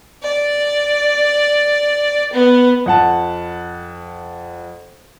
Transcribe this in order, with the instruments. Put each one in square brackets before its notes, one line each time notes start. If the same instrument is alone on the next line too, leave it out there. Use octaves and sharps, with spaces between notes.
[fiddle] D5
B3
[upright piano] F2 F#5 A5